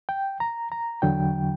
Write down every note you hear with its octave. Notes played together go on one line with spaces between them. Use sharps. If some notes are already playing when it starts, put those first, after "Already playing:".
G5
A#5
A#5
E2 D3 F#3 G5